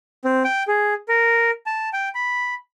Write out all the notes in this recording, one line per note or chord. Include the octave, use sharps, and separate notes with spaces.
C4
G5
G#4
A#4
A5
G5
B5